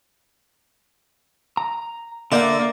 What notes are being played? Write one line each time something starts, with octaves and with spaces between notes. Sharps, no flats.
A#5
D3 A#3 D5 E5 F#5 G6